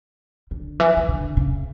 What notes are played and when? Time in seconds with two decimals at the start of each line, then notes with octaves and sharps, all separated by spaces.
0.51 D3
0.80 E3
0.97 E3
1.09 D3
1.37 C#3